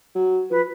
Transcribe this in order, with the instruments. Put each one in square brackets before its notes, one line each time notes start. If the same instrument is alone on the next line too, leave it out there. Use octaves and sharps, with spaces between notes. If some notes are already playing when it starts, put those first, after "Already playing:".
[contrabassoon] F#3
[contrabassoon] F3 [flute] B4